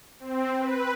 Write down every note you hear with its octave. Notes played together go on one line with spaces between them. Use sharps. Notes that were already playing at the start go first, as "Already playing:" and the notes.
C4
B4